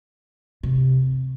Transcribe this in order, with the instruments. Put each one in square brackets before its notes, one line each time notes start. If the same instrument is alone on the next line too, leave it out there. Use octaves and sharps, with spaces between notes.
[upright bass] C3